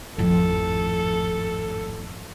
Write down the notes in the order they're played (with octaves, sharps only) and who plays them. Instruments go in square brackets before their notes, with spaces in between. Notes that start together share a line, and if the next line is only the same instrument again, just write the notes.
[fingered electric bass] G#1 A2 [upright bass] F2 F3 [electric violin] A4